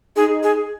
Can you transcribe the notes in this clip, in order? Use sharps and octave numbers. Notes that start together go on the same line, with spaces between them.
D#4 G#4
G#4